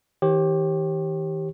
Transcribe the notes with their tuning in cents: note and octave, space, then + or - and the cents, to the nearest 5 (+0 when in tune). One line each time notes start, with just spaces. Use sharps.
D#3 +45 G4 +0 C#5 -45